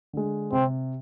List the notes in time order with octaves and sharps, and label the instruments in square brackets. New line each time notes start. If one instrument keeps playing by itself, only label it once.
[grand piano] D3 G#3
[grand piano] C3 [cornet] C4